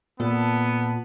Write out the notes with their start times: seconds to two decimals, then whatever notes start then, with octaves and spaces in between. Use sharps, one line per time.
0.20 A#2 B3 A4